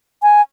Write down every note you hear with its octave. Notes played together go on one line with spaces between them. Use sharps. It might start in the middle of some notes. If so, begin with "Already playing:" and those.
G#5